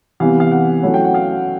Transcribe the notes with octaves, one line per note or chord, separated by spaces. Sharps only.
C3 E3 G3 B3 F5
F5
F#5
F#3 A3 C#4 E4
G5
F#5
F5